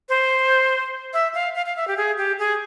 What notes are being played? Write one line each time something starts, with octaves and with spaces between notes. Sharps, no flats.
C5
E5
F5
F5
F5
E5
G4
G#4
G4
G#4